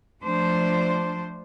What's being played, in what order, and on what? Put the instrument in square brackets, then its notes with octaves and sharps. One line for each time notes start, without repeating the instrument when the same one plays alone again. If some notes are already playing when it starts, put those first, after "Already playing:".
[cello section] F3 A3 D4 C5